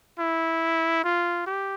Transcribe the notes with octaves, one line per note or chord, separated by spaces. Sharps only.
E4
F4
G4